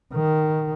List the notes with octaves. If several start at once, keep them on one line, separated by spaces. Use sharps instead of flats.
D#3